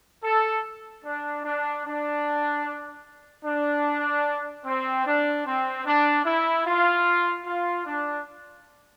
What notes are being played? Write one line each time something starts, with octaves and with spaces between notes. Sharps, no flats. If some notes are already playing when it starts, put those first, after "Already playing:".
A4
D4
D4
D4
D4
C4
D4
C4
D4
E4
F4
F4
D4